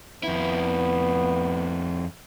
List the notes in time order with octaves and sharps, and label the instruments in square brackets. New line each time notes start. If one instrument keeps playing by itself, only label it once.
[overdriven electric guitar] F2 E4 [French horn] B3